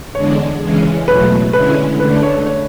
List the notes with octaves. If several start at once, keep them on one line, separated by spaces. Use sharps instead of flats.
E2 D3 G#3 D4 C#5
C#3 E3 G#3 C#4
E2 B2 F#3 A3 B4
D3 G#3 C#4 E4 B4
D3 A3 D4 B4
C#5
C#5